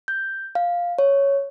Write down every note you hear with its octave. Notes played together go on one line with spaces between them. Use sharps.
G6
F5
C#5